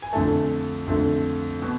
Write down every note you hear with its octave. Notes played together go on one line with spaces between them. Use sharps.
G#5
F2 D3 A3 A5
F2 D3 A3
B2